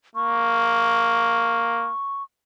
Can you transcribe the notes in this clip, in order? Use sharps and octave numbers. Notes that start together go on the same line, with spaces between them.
A#3 C#6